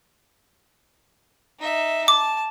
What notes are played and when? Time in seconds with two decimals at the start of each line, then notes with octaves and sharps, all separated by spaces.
1.60 D#4 E5
2.08 A5 D6